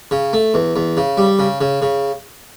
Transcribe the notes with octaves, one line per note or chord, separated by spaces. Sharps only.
C#3
A3
E2
E2
C#3
G3
C#3
C#3
C#3